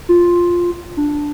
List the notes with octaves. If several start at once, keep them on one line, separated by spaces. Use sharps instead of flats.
F4
D4